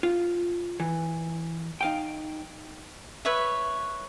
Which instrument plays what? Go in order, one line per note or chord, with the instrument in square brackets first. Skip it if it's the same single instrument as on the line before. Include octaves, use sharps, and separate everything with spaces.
[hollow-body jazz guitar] F4
E3
D#4 F5 G5
[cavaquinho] B4 C#5 E5